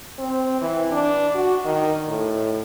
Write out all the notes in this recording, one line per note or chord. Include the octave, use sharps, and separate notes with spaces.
C4
E3
D4
F#4
D#3
A2